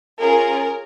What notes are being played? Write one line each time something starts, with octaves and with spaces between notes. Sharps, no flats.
C#4 F4 G#4 A#4